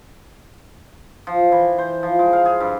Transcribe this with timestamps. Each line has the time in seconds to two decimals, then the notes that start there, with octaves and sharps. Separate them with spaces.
1.27 F3
1.52 E3
1.78 C5
2.03 F3
2.19 G#3
2.33 F5
2.45 G#4
2.60 G2